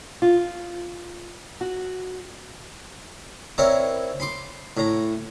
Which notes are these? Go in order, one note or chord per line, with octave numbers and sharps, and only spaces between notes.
F4
F#4
C4 E4 A#4 C#5 D5 A#5
B5 C6 D6
A2 A#5